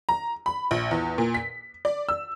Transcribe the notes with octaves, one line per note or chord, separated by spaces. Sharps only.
A#5
B5
A#1
E2
A#2
B6
D5
E6